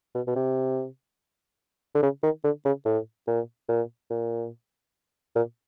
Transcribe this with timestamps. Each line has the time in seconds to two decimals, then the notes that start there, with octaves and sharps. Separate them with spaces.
0.15 B2
0.27 B2
0.36 C3
1.95 D3
2.02 C#3
2.23 D#3
2.44 D3
2.65 C#3
2.85 A2
3.27 A#2
3.69 A#2
4.10 A#2
5.35 A#2